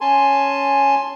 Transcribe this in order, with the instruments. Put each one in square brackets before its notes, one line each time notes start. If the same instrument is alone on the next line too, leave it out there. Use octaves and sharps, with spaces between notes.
[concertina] C#4 G#5 A5 C6